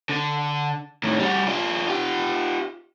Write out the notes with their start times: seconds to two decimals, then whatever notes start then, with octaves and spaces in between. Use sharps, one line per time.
0.09 D3
1.04 A2 D#3
1.19 G3 F#4
1.47 D4 F4
1.88 F4 G4